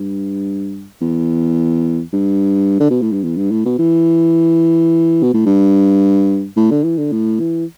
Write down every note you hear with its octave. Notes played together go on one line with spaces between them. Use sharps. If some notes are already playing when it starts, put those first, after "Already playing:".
Already playing: G2
E2
G2
D3
B2
A2
G2
E2
G2
A2
B2
E3
B2
A2
G2
A2
D3
E3
D3
A2
E3